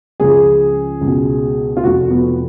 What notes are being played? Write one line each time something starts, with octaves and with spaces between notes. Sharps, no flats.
C#2 C#3 F3 G#4
C#2 B2
F4
F1 F2 F3 F#4
B3